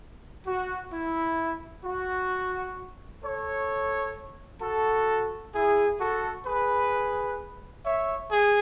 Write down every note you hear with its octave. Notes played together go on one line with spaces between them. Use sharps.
F#4
E4
F#4
A4 C#5
F#4 A4
E4 G#4
F#4 A4
G#4 B4
C#5 E5
G#4